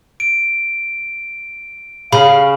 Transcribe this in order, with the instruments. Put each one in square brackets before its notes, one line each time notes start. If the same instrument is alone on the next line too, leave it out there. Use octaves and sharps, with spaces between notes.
[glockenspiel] D7
[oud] C#3 [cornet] F5 [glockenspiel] B5